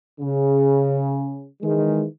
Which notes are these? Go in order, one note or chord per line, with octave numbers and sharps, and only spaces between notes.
C#3
D#3 E3 G#3